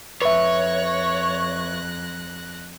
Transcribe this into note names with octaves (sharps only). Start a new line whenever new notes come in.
F2 B4 C#5 E5 F#6 A#6